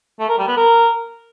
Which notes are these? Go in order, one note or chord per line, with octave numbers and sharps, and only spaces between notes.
A3
A#4
G3
B3
A#4